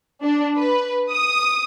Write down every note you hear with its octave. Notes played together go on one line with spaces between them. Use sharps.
D4
B4
D#6